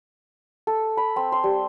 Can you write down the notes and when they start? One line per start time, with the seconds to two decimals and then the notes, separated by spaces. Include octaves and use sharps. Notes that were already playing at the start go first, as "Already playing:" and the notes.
0.67 A4
0.97 B5
1.16 C4
1.32 C6
1.44 G3